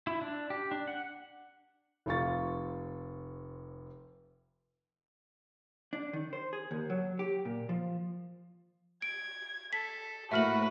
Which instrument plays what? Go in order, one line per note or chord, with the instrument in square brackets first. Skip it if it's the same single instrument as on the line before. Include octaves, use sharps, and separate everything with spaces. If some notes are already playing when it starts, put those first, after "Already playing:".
[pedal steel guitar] E4
D4
G4
D4
F#5
[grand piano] F1 C3 F4 C#6 A6
[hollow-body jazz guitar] D4
D#3
C5
G#4
D#2
F#3
G4
A#2
F3
[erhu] G#6 [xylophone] D7
[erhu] A4 [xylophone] B6
[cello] A2 A#3 [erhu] F#4 [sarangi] B4 [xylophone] E5 F6 F#7